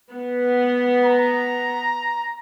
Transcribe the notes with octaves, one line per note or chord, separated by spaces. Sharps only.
B3
A#5